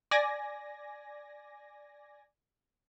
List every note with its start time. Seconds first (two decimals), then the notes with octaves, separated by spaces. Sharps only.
0.11 D5 G#5 A#6